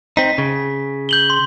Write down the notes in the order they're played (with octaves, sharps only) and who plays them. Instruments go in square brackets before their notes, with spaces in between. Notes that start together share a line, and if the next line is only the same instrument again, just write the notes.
[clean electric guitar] C4 D#4 [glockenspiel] B6
[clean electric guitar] C#3
[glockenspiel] G6 F#7 G7
C6